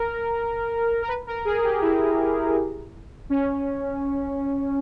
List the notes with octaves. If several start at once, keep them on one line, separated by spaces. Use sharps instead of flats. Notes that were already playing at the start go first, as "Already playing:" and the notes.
Already playing: A#4
A#4
B4
A#4
G#4
G4
E4
C#4